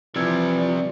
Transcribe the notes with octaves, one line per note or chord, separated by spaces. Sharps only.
C3 E3 F3 G3 E6 F6 G#6
D5